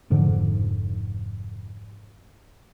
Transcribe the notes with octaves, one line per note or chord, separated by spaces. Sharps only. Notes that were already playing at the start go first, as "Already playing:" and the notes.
F1 G#2 D3 F3